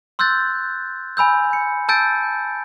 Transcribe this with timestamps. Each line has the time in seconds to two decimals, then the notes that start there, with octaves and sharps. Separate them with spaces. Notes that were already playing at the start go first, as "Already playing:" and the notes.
0.19 C6 E6 F#6 G6 A6
1.17 G#5 B5 E6 G6
1.53 C#7
1.89 A5 E6 G6 A6 D7